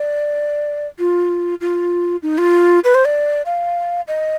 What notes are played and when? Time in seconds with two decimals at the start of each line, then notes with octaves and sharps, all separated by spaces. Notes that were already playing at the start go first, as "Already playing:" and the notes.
Already playing: D5
0.99 F4
1.61 F4
2.23 D#4
2.38 F4
2.84 B4
2.95 C5
3.05 D5
3.46 F5
4.08 D#5